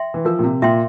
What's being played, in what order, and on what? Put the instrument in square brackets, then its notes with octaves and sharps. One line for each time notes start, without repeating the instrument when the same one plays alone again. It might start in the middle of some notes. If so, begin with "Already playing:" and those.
Already playing: [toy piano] E5 G5 C6
[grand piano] E3
[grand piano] F3 [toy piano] A#4
[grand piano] A#2
C3
[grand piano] A#2 [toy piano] E5 G5 C6